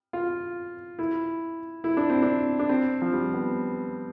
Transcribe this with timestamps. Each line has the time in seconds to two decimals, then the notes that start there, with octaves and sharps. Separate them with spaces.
0.13 F4
0.99 E4
1.84 E4
1.97 D4
2.10 C4
2.22 D4
2.59 D4
2.69 C4
3.02 F3
3.13 G3
3.34 B3